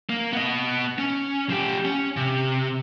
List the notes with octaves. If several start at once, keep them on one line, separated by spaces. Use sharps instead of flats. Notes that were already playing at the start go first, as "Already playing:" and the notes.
A#3
B3 D#5
C#4
F3 G4
C#4
C3